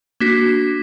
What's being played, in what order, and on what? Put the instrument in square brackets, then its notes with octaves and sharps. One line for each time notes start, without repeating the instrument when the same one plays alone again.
[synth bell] A#3 D4 F#4 [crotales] B6